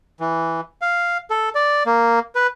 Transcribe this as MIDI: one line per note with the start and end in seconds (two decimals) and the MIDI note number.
0.20 0.61 52
0.81 1.17 77
1.30 1.49 69
1.55 1.83 74
1.86 2.19 58
2.35 2.47 71